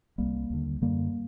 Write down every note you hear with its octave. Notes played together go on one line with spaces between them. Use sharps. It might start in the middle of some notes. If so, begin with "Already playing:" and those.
C2 C3 G3 A#3
D#2 D3
F#2 D3 G3 A#3